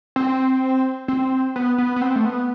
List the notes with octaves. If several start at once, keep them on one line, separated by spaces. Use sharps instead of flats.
C4
C4
B3
B3
B3
C4
A3
B3